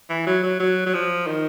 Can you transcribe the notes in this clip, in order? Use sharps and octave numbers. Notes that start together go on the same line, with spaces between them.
E3
F#3
F#3
F#3
F#3
F3
D#3